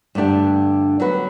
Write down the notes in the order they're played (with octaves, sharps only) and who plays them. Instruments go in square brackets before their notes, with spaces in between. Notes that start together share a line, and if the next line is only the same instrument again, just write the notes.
[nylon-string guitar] G2 D3 A3 D4 G4
F#3 B3 F#4 B4